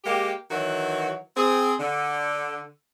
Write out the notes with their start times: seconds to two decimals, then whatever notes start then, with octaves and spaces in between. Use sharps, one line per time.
0.05 G#3 A#3 G4
0.50 D#3 E3 F#3 F#4
1.36 C4 G#4
1.80 D3